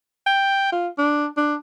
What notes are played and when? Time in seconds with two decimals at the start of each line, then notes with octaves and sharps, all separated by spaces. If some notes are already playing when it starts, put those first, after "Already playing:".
0.26 G5
0.72 F4
0.98 D4
1.37 D4